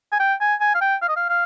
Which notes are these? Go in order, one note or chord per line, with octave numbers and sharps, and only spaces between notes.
G#5
G5
G#5
G#5
F5
G5
F5
D#5
F5
F5